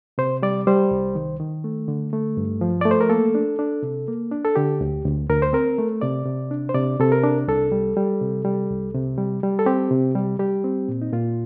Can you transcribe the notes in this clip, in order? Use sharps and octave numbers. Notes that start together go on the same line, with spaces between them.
C3 C5
G3 D5
G3 C5
C2
D#3
D#3
A3
D3
A3
G2
F3
A3 D5
C5
A#4
A#3 A4
D4
D4
C3
A#3
D4
A4
D3 G4
D2
D2
D2 A#4
C5
C4 A#4
A3
C3 D5
C3
D4
C5
C3 D5
C3 A4
A#4
D4
C2 A4
G3
G3
C3
G3
C2
C3
G3
G3
A4
C4 G4
C3
G3
G3 G4
C4
A#2
D#4
A#2 F4